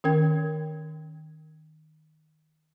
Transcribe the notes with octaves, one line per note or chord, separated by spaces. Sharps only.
D#3 C#4 A#4 G5 G#6